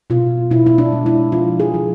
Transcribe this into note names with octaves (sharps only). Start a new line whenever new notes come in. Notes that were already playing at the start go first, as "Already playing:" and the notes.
B2 F4
B2 E4
E4
D4
G#3
E4
F3 F4
G#4
F3